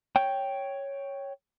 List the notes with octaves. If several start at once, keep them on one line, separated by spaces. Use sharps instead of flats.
C#5 G5